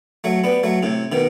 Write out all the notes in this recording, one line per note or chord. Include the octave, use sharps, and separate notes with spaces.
F#3 A3
G3 B3
F#3 A3
A2 C3
B2 D#3